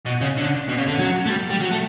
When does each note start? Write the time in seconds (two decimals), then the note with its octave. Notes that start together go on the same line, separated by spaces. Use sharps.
0.06 B2
0.21 C#3
0.37 D3
0.68 B2
0.78 C#3
0.88 D3
0.99 F#3
1.26 A3
1.29 G3
1.50 G3
1.60 F#3
1.71 A3